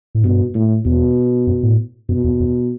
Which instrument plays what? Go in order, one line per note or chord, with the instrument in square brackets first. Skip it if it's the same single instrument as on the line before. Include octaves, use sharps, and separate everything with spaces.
[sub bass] A2
[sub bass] G2 [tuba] B2
[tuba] A2
[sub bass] E2 [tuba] B2
[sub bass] F#2
A2
[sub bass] F#2 [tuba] B2
[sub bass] E2
E2